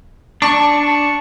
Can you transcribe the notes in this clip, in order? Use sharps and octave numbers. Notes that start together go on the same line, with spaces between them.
D4 C#6